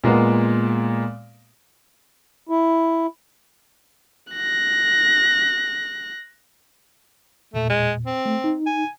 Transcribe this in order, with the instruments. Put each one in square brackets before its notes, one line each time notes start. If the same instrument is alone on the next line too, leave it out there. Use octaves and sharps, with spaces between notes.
[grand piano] A#2 G#3 A#3 B3
[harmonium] E4
[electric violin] F#6 A#6
[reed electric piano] E2 A#2 [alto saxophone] A3
[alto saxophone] G#3
C4
[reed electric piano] A3
D#4
[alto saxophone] G#5